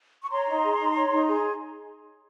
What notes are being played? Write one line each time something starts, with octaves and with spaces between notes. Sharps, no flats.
C#6
C#5 A#5 C6
D#4
G#4
D#4
C#5
D#4
G#4